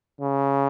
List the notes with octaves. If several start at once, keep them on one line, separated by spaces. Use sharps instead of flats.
C#3